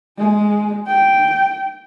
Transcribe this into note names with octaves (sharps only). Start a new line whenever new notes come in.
G#3
G5